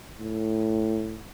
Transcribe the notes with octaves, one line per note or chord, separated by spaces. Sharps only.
A2